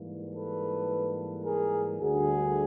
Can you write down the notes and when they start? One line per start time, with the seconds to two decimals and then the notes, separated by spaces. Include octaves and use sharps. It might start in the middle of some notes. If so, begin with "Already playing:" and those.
Already playing: G#2 E3 G3 A#3
0.34 A4 B4
1.44 G#4 A#4
1.99 D2 D3 G3 F#4 G#4